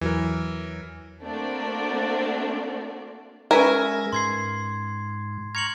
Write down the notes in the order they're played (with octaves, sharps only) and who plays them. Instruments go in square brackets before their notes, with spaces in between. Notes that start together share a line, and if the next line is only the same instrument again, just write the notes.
[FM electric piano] E2 F#3 [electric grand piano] E3 A#4
[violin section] A3 A#3 C4 D4 F#4 D5
[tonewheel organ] G#3 G#6 A#6 [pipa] C#4 B4 E5 [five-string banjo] A#4
[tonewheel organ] G#2 [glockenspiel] C6 G#6 C7
[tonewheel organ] A#5 C#6 F6 [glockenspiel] G#6 C#7 F#7